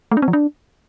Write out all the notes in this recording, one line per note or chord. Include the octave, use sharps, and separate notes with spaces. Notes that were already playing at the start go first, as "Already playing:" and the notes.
A3
D4
C4
F3
D4